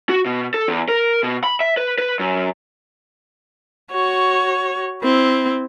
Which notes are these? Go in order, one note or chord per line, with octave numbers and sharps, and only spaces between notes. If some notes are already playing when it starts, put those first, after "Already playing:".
F#4
B2
A4
E2
A#4
B2
B5
E5
B4
B4
F#2
F#4 C#5
C4 E4